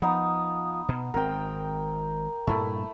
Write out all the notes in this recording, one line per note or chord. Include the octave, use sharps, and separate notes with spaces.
F3 B3 D#4
B2
G#1 C4 A#4 G5
G2 A#2 A3 E4